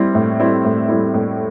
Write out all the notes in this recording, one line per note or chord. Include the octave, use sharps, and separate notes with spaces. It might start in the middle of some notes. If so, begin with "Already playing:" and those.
Already playing: G3 C4 E4
A2
G3 C4 E4
A2
G3 C4 E4
A2